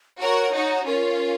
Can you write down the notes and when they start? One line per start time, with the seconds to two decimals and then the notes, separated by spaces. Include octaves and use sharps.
0.21 F#4 A#4 C#5
0.53 D#4 F#4
0.86 C#4 F4 A#4